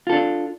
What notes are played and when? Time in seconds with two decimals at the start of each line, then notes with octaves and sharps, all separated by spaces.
0.07 F4
0.10 A4
0.12 D4